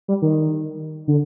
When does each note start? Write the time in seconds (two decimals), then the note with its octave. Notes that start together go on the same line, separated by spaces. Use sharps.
0.08 G3
0.22 D#3
1.08 D3